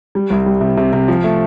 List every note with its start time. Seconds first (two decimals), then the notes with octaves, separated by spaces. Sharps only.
0.15 G3
0.30 C2
0.46 G3
0.61 C3
0.77 C3
0.93 C3
1.08 F3
1.24 A3